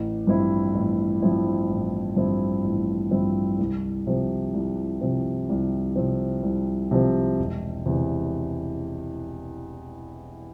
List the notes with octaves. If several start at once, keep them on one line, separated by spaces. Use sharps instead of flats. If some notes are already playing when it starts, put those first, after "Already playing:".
Already playing: A1
G2 F3 C4 E4
A1
G2 F3 C4 E4
A1
G2 F3 C4 E4
A1
G2 F3 C4 E4
C2
C3 F3 C4
C2
C3 F3 C4
C2
C3 F3 C4
C2
C3 F3 C4
E1
E2 C3 E3